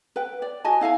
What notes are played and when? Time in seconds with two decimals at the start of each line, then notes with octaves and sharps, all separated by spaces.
0.16 B4 G5
0.42 D5
0.64 F#4 D#5 G#5 A5
0.81 E4 F5 G5 G#5